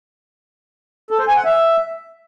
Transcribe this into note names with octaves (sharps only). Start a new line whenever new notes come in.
A4
C5
G#5
F#5
E5